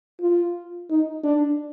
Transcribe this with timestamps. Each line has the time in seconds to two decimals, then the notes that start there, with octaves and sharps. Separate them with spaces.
0.21 F4
0.90 D#4
1.24 D4